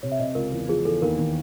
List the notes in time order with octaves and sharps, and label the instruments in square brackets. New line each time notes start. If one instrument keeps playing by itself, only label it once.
[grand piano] C3 [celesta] C#5
[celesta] E5
[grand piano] C3 [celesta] D#5
[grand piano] C#2 [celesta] A#4
[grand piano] E2 [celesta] A#4
[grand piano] F3 [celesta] G#4
[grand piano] E2 [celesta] A4
[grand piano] D#2 [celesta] A#4
[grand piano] D#3